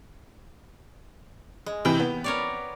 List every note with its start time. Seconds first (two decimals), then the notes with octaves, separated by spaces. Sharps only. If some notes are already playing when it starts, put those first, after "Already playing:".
1.66 G#3
1.85 C3 E3 G5
1.99 B3
2.24 A#4 C#5 D5